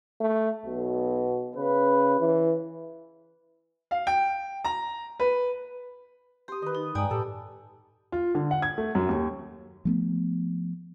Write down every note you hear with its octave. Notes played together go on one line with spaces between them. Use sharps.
A3
B1 B2
C#3 B4
E3
F5
G5
A#5
B4
G4 C6 D#6
D#3 B4 D#5
D#4
G2 G#3 D5 G5 G#5 A#5 B5 D#6
A2 G4 A4
F4
D3
F#5
G#6
A3
F#2
D#2
F3 A3 B3